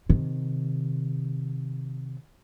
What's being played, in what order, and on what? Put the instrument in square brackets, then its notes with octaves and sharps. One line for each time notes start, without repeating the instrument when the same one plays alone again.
[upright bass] C3 D#3